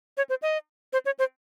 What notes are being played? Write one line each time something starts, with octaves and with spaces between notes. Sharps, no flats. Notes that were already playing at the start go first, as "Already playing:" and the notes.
C#5
C5
D#5
C5
C#5
C5